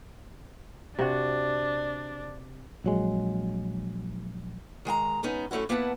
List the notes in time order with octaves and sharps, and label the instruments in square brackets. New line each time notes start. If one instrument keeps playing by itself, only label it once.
[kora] C3 F#4 [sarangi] D4
[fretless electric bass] A#1 F#3 G#3
[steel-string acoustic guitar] D#3 G#3 G5 A#5
G#3 B3 C#4 D#4
F#2 A3 C#4 E4 F#4
A#3 B3 E4 B4 F#5 A5